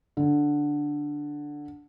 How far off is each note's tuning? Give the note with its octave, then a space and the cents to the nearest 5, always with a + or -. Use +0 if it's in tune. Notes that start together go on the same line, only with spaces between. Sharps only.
D3 +0